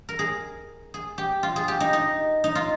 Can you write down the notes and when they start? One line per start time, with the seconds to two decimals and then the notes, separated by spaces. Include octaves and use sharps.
0.09 A#4
0.19 G#4
0.94 G#4
1.18 G4
1.43 F4
1.56 G#4
1.68 G4
1.80 D#4
1.93 D#4
2.44 D#4
2.55 F4